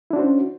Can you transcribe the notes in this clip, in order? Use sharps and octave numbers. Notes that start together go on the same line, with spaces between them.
C#4 D4 E4 F#4 C5